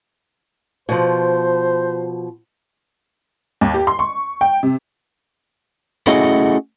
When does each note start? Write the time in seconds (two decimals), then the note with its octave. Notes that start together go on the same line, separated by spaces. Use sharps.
0.89 B2 F3 C5
3.61 D#2
3.74 G4
3.87 C6
3.99 C#6
4.41 G5
4.63 C3
6.07 A3 C#4 E4 F#4 G#4 D#5